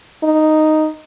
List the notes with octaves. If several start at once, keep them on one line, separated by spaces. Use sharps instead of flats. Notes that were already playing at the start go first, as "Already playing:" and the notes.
D#4